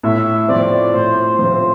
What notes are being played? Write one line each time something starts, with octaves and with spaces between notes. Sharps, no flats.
A2 E5
F3 C4 D5
A2 C5
F3 C4